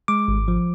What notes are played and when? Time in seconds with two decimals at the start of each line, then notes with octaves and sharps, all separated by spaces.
0.08 G#3 D6
0.28 G#1
0.48 F3